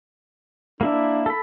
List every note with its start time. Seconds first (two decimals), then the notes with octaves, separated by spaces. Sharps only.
0.81 A#3 D4 E4 E5
1.26 A4 B5